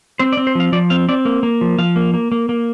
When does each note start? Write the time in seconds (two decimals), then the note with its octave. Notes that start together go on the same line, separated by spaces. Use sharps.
0.19 C4 C5
0.32 D5
0.37 C4
0.47 C5
0.55 F3 F5
0.72 F3 D5
0.90 C4 F5
1.09 C4 D5
1.25 A#3
1.43 A#3
1.61 F3
1.78 F3 F5
1.96 A#3
2.14 A#3
2.32 A#3
2.49 A#3